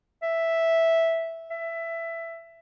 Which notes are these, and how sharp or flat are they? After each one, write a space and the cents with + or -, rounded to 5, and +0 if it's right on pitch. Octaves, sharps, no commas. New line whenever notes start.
E5 -5
E5 +15